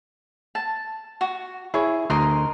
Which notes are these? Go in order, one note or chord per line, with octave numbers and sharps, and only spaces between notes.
A5
F#4
E4 G#4 C#5
D2 A#4 D#5 C6